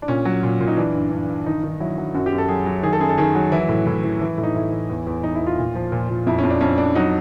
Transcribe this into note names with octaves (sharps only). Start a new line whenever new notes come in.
D4
A#2 C#4
F#3
A#2
A#2
D#4
E3 D4
G2
G2
G2
D#3 D#4
D#3
F#3 E4
F#3
F#2 F#4
G4
F#2
A4
F#3 G#4
F#3
D#3 G#4
A4
F#2 G#4
A4
D#3 G#4
F#3
E3 E4
A2
A2
E3
E3
A2
D#4
A2 E4
E3
E2
E2
E2 D#4
E4
E2
F4
A#2
F3
A#2
A#2
F2 E4
C#4
F2
D4
F2 C#4
F2 D4
F#3 D#4